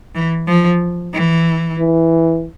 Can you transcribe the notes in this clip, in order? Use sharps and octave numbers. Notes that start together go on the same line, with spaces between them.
E3
F3
E3
E3